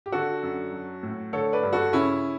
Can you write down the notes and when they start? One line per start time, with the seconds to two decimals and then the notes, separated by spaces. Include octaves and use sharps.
0.06 G4
0.12 D3 F#4 A4
0.43 F#2
0.72 F#3
1.03 A2
1.33 D3 A4 C#5
1.53 B4 D5
1.63 G2
1.73 F#4 A4
1.93 C#3 C#4 E4